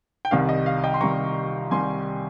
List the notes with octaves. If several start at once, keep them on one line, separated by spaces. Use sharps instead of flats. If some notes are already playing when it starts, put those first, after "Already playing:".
G5
C2 C3 D#3 G3 F5
D#5
F5
D#5 G5
C6
C2 C3 D#3 G3 A#5 C#6
C2 C3 D#3 G3 G#5 C6